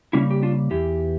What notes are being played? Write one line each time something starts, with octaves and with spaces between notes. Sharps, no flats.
C#3 G3 A#3 C#4 E4
G4
D4 F4
E2 E3 G4